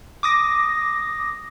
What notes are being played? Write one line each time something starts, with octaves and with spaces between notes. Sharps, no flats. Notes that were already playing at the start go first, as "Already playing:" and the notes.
D6 D#6 A#6